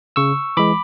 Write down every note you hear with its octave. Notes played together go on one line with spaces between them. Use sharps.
C#3 C#6 E6
E3 G#3 B5 D6